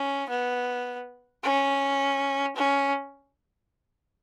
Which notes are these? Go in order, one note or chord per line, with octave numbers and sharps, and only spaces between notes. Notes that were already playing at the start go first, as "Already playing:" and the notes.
Already playing: C#4
B3
C#4
C#4